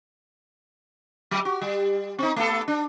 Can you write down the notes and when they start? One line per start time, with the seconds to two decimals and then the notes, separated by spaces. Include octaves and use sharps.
1.31 F#3
1.45 F#4
1.62 G3
2.19 C4 D#4
2.36 A3 B3 A4
2.68 D4